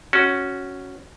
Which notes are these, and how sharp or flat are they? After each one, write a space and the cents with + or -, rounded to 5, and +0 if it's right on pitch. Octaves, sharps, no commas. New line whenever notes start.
C#4 +0 F#4 +0